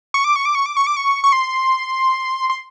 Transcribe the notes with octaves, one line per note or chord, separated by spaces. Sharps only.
C#6
D6
C#6
D6
C#6
D6
C#6
D6
C#6
C#6
C6
C6